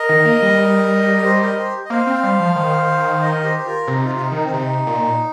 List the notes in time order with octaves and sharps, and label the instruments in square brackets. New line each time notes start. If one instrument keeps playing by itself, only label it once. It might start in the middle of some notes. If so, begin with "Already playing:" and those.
Already playing: [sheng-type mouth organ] A#4 D#5
[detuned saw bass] D#3
A#3
G3
[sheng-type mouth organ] A#4
G4 C5
A#4 D#5
G4 C5
D#5
[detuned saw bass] A#3 [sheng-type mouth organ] C5 F5
[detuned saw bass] C4
G3
F3
D#3
[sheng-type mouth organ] A#4 D#5
G4 C5
C5
F4 A#4
[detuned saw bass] C3
[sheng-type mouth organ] D#4
F4
[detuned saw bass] C3
[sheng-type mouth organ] F4
D#4
[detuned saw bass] D#3 [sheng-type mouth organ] D#4
[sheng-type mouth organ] C4
[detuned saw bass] C3 [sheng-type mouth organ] D#4
[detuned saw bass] A#2